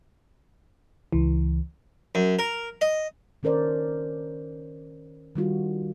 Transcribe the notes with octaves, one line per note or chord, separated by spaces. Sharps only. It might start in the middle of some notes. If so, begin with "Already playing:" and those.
C#2 E3
F#2
A#4
D#5
D#3 C#4 A#4 C5 D5
D#3 G3 F4 F#4